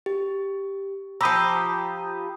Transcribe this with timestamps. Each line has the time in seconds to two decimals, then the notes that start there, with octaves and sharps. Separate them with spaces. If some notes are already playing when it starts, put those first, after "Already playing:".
0.06 G4
1.21 F3 G4 A#5 B5 D#6 E6 G6